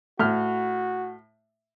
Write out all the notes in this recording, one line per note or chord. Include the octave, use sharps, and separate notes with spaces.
A2 F#4 F6